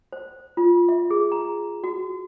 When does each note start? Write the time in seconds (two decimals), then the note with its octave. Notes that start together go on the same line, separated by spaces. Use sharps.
0.13 C5
0.57 F4
0.89 E5
1.11 G#4
1.32 A#5
1.84 F#4